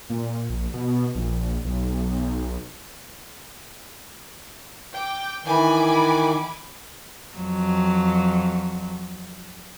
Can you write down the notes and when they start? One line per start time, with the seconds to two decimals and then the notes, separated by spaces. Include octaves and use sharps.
0.10 A#2
0.50 A#1
0.74 B2
1.15 A#1
1.65 B1
4.92 G5 D6
5.45 D#3 E3 G#5 B5 D6
7.35 F2 F#3